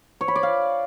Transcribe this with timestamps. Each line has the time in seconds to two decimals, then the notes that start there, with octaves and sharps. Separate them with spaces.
0.21 C#5
0.28 B5
0.36 D5
0.43 F5